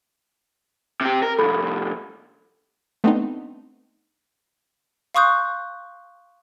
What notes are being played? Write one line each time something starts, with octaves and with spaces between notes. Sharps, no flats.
C3 G4
A#4
C2 F2 A4 B5
A3 B3 C4 D4 D#4
F5 C6 C#6 D#6 F#6 G6